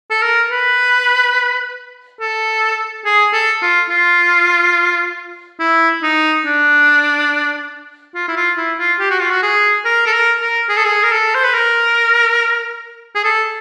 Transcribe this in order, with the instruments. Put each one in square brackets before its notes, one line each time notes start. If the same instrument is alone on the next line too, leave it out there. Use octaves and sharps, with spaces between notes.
[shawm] A4
A#4
B4
A4
G#4
A4
F4
F4
E4
D#4
D4
F4
E4
F4
E4
F4
G4
F#4
F4
F#4
G#4
A#4
A4
A#4
A#4
G#4
A4
G#4
A#4
A4
C5
B4
A#4
G#4
A4